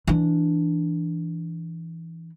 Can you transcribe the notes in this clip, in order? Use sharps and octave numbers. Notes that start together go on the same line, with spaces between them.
E3 D4